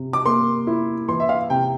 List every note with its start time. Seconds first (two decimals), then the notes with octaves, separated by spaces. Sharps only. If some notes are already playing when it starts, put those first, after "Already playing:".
Already playing: C3
0.13 D6
0.25 A#3 C6
0.67 E4
1.08 E3 C6
1.20 E5
1.29 F5
1.50 C3 G5